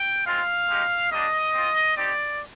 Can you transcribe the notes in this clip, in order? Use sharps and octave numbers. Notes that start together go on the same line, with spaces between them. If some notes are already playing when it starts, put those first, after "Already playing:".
Already playing: G5
G#3 C4 F4 F5
G#3 D#4 G4
G3 A#3 D4 D#5
C4 F4
C4 D#4 G4 D5